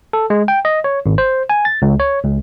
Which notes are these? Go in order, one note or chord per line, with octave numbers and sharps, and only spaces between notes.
A4
G#3
G5
D#5
C#5
G#1
C5
G#5
A6
C#2
C#5
C#2